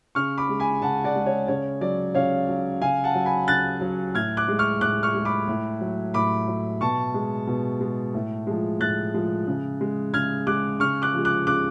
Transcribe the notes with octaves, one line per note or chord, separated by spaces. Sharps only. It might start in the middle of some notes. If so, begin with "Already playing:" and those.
C#3 C#6 F6
B5 D6
G#3
G#5 B5
C#3 F#5 A5
D5 F#5
G#3
C#5
C#3 C#5
F#3 D5
C#3 C#5 F5
F#3
C#3 F5 G#5
F#5 A5
F#3
G#5 B5
C#3 F#6 A6
F#3
A2 F6 G#6
D6 F#6
G#3
C#6 F6
A2 D6 F#6
C#6 F6
G#3
B5 D6
A2
F#3
A2 B5 D6
F#3
B2 A5 C#6
G#3
B2
G#3
A2
F3 G#3
A2 F#6 A6
F3 G#3
C#3
G#3
C#3 F6 G#6
G#3 D6 F#6
C#3 C#6 F6
D6 F#6
F3 G#3
D6 F#6
C#3 D6 F#6